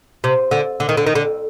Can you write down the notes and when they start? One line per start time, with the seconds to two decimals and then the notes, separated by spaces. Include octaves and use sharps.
0.24 C3
0.51 D3
0.80 D3
0.89 D#3
0.97 D3
1.06 D#3
1.15 D3